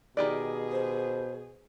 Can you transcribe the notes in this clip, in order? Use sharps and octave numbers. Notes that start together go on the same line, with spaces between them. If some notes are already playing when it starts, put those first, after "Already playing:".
B2 D#3 G4 G#4 D5
C5